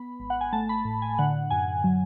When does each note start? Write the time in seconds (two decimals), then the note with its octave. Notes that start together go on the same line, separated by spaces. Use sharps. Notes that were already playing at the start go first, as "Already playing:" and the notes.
Already playing: B3 B5
0.20 G#1
0.30 F#5
0.41 G#5
0.53 A3 A5
0.69 B5
0.85 A2
1.02 G#5
1.18 D3 F#5
1.51 F#2 G#5
1.84 F#3